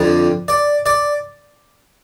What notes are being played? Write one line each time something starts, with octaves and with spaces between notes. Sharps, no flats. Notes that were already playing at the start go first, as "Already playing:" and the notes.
Already playing: F2 D3 F3 D5
D5
D5